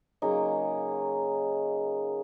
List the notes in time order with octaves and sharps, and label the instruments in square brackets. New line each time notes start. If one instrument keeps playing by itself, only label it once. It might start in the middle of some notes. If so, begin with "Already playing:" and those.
[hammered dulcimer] C#3 F#3 A#3 D#4